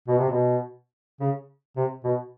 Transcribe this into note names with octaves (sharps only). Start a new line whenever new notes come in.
B2
C3
B2
C#3
C3
B2